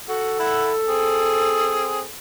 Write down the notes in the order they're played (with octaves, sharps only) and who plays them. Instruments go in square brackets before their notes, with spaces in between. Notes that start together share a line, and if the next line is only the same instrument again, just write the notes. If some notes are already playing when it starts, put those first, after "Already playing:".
[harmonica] F#4 [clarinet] A4
[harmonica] E4 F#5
C4 G#4